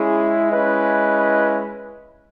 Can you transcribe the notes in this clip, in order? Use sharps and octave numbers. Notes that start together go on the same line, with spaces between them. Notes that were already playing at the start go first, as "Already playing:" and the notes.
Already playing: G#3 C#4 E4 G#4
G#3 C#4 E4 B4 D#5